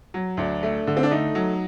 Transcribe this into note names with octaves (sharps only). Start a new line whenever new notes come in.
F#3
D2 D4
A3
D3
C4
D4
A3 D#4
F#3